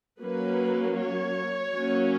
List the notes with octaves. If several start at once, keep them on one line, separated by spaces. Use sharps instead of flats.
F#3 A#3 C#4 B4
C#5
F#3 A#3 C#4